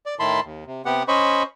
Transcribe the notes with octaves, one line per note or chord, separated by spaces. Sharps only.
D5
A2 D#3 E4 A5 B5 C6
D#2
C3
C3 B3 G4 F#5
C#4 C5 D#5 B5 C#6